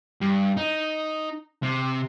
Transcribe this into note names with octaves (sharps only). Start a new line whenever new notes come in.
G2
D#4
C3